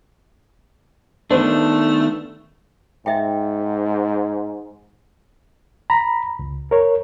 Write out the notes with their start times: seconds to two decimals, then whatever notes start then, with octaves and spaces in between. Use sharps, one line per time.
1.31 D#3 A3 B3 D4 C5
3.06 G#2 D#5 E5 G5
5.90 A#5 B5
6.39 C#2
6.71 A#4 C#5